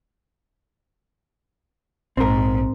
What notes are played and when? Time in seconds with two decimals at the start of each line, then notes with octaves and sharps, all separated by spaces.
2.17 A#1 G#2 C4 A#4